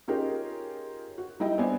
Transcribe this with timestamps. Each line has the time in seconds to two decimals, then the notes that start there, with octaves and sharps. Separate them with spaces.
0.08 C#4 D#4 F4 G4 G#4 A#4
1.18 F#4
1.40 G3 D#4 E4 D#5 G5
1.58 B3 C4 D4 C5 D5 G#5